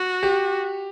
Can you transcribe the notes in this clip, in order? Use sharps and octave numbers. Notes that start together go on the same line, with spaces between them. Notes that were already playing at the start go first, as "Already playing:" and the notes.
Already playing: F#4
G4